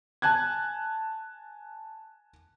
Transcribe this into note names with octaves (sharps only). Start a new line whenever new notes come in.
G#5 A5 F#6 G#6